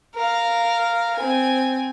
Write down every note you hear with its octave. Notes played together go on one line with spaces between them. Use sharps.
A#4 F5
C4 G#5